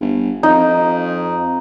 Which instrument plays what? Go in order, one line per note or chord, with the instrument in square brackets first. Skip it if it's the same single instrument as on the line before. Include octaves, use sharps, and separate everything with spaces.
[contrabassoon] G1
[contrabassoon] F2 [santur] D#4